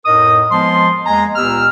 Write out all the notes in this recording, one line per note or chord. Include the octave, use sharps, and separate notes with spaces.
F2 A2 D#4 A#4 D#5 D#6
F3 G#3 B3 A5 C6
E2 G#3 A#3 G#5 A#5
C#2 A#2 B3 G4 E6 F6